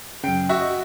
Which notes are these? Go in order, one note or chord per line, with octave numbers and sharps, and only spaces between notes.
F#2 C#3 G5
F#4 E5 C#6
D#5